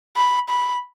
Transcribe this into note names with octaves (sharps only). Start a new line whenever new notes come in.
B5
B5